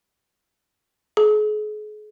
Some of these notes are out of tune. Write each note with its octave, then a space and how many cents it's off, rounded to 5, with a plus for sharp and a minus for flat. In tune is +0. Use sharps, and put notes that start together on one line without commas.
G#4 +40